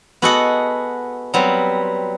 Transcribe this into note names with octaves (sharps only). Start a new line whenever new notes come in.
B3 F#4 G#4 A4 D#5 F#5
F#3 G3 B3 C4